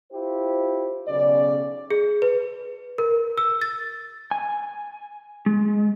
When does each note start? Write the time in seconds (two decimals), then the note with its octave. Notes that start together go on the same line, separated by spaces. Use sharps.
0.12 E4 F4 G4 C5
1.08 B1 C#3 D5
1.90 G#4
2.22 B4
2.98 A#4
3.38 E6
3.61 A6
4.31 G#5
5.46 G#3